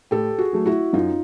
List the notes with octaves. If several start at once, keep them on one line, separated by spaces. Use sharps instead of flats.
A2 G4 A4
F#4 G#4
F#3 A3
E4 F#4
F#2 D#4 F4